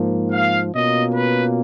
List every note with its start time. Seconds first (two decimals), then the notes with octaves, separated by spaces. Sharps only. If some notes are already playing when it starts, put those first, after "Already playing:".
Already playing: G#2 F3 A#3
0.32 F5
0.73 B2 A#3 C#4 F4 D#5
1.14 B4